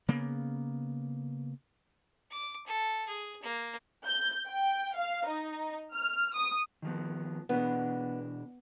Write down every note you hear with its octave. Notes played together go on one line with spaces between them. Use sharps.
C#3 A#3 B3
D6
A4
G#4
A#3
G6
G5
F5
D#4
F6
D#6
D#3 F3 B3
B2 E3 B3 D4